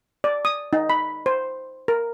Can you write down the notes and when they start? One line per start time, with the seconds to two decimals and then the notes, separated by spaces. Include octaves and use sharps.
0.24 D5
0.45 D#6
0.73 D#4
0.90 B5
1.26 C5
1.88 A#4